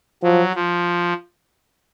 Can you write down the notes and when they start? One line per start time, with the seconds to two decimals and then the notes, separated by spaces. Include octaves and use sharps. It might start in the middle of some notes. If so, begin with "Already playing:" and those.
0.23 F3 F#3
0.55 F3